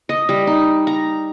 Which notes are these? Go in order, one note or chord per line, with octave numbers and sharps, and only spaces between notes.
D#5
G3
D#4
A#5